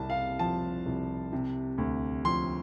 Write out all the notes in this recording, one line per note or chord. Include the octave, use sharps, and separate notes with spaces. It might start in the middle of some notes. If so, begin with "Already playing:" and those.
Already playing: C2 C3 A5
F5
F3 A5
C2
C3
D2
F3 C6